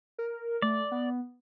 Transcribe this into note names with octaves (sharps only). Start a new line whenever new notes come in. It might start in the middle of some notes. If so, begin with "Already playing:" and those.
A#4
A3 D5
B3